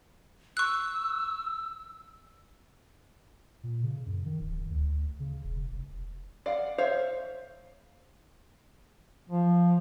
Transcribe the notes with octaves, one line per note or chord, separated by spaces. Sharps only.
C#6 E6 F#6
A#2
C#3
F#2
D#3
D1
D2
C#3
E1
F1
D5 F5 F#5
C5 C#5 E5 F5
F3